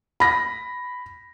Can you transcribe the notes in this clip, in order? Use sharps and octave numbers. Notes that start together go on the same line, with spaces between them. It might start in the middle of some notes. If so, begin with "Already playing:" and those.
B5 A#6